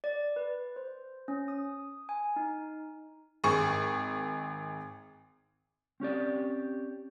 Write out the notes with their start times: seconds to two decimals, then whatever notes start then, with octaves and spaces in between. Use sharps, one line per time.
0.04 D5
0.36 B4
0.76 C5
1.28 C#4
1.48 D#6
2.09 G#5
2.36 D#4
3.44 G#1 G#4 C#6
6.00 C4 C#4 G4 D5